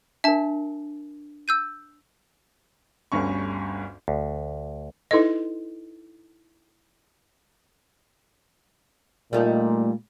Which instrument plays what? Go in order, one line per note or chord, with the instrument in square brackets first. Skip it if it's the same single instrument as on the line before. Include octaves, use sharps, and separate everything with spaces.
[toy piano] D4 A#4 [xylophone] E5 A5
[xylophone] E6 G6 D#7
[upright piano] G1 D2 G2 C#4 C#6
[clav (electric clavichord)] D2
[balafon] D#4 E4 A4 B4 D#5
[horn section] A#2 [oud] G3 A3 D#4